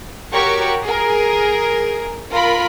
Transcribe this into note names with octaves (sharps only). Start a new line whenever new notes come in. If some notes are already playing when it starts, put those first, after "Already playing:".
F#4 G4 A#4 C#5 C#6
G#4 A#4
F4 A#4 B5